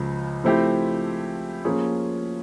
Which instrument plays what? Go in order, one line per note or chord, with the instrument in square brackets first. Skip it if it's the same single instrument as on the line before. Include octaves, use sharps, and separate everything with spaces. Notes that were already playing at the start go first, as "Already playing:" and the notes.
Already playing: [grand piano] C#2 C#3 F3
F3 A3 C4 E4 G4
F3 A#3 C#4 F4 G#4